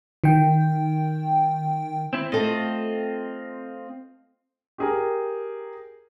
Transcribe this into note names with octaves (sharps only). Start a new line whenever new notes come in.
D#3 G5
C4 E4
A3 C4 F4 A4 D#5
G4 G#4 A#4